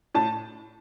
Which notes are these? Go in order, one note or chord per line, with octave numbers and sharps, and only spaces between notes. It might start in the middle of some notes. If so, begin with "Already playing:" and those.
A2 A5